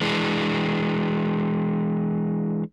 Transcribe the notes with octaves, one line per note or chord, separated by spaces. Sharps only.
E3 G#3 D4